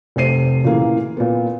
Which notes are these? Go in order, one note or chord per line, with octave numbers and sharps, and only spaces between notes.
F1 C3 C5 C7 D#7
A#2 C#3 E3 A#3
A#2 B3